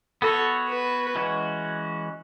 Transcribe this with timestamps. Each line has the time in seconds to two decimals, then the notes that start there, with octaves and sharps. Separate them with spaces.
0.22 B3 F#4 A4 C#5
0.69 B4
1.15 E3 G#3 C#4 F#4